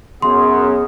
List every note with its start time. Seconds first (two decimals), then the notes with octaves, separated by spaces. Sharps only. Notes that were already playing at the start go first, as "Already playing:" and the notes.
0.22 F#2 B3 G#4 C6